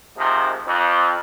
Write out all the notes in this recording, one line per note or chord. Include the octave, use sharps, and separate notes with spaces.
G#2 C3 D#3 F3
F2